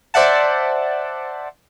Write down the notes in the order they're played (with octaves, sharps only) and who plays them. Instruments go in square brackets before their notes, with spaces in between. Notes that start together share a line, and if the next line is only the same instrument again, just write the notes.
[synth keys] C5 D5 E5 F#5 A5